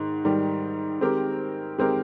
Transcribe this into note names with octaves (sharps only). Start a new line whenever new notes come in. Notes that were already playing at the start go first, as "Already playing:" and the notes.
Already playing: G#2 D#3
G#2 D#3 G3
D#3 G#3 C4 G4 A#4
D#3 G#3 C4 G4 A#4